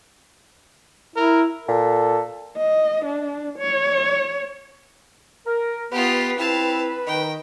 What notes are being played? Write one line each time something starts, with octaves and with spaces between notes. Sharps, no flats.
E4 A#4
A#2 A4
D#5
D4
C#5
A#4
B3 F4 G4 B4
C4 E4 F5 A5
D#3 D#4 G5